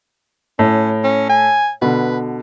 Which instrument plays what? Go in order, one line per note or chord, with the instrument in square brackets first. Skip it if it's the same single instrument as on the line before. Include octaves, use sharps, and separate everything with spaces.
[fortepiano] A2 [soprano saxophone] C#4
[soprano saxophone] C#4
G#5
[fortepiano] B2 D3 [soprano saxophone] B4